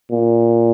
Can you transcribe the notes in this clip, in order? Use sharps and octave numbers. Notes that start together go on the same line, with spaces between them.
A#2